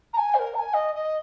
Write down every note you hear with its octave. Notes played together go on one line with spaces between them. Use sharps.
A#5
G#5
C5
A#4
A#5
G#5
D#5
D#5